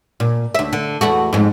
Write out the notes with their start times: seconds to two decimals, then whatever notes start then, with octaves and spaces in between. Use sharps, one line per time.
0.20 A#2
0.55 D2 E5
0.73 D3
1.01 E2 A3 F#4
1.33 F2 G#2